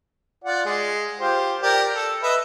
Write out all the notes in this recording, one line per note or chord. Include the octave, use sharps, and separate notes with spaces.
F4 D5 F#5
G#3
F4 G4 C5
G4 A#4 D5
A4
B4 D#5 E5